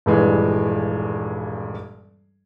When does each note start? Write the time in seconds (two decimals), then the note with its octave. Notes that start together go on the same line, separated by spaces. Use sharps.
0.06 D#1 A#1 G2 E3 G#3